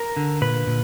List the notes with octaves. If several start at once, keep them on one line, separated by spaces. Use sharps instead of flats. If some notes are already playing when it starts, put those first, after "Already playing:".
Already playing: A#4
D3
A#2 B4
A#2